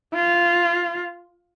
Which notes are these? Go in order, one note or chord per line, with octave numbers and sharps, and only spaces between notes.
F4